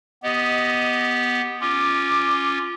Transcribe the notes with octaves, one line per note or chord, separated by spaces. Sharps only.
B3 G4 D#5
C#4 F4 D6